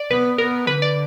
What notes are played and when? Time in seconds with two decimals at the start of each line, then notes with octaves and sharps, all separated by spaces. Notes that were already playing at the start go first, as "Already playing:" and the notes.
Already playing: D5
0.10 B3 B4
0.38 B3 A#4
0.67 D3 B4
0.82 D5